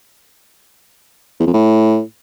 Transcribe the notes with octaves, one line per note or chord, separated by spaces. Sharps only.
E2
F2
A2